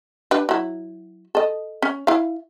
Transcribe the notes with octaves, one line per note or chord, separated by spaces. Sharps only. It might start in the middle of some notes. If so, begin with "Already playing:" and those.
D4 G4 B4
F#3 E4
A4 D#5
C#4
E4 F5